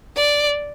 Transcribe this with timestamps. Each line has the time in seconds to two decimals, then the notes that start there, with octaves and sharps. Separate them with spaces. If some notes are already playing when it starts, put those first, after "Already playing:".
0.17 D5